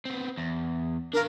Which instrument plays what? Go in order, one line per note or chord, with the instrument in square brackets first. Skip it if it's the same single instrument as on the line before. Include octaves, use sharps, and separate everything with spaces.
[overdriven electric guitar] B3 C4
E2
[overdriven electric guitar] D4 F5 [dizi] A#4